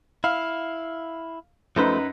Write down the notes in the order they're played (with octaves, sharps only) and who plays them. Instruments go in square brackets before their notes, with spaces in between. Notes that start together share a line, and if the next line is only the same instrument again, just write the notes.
[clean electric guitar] E4 [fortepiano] F5
[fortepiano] F#2 D#4 B4 [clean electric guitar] F3 A3 C5